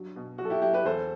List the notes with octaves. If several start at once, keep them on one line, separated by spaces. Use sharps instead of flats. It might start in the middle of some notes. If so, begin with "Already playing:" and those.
Already playing: G2 F#3
B2
F#3 F#4
A4
E4 G4
F#3 E4 G4
G4 B4
E2 A4 C5